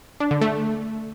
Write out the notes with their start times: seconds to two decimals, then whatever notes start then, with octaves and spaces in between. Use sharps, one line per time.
0.20 D4
0.31 D3
0.41 A3